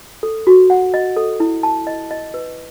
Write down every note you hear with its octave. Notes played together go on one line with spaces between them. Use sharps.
A4
F#4
F#5
D#5
A4
E4
A5
D#5
D#5
B4